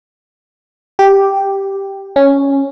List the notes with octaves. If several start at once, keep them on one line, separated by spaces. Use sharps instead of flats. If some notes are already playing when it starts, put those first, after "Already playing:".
G4
C#4